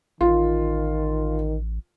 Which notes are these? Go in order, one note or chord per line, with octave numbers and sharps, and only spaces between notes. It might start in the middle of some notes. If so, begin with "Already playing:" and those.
A1 D#3 F4